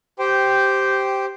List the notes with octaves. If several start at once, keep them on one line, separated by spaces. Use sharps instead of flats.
G4 C5 G5